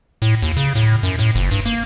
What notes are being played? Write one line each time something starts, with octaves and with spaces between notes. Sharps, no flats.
A2
D#2
C#3
A2
F#2
A2
F#1
G2
A#3